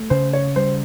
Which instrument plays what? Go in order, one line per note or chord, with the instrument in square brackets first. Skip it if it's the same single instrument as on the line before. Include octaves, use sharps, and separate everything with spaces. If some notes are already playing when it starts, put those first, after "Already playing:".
Already playing: [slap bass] A3
[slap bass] C#3 [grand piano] C5
[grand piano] C#5
[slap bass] G3 [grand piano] C5